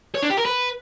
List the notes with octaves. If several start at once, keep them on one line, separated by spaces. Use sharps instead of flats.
C#5
D4
G4
A#4
B4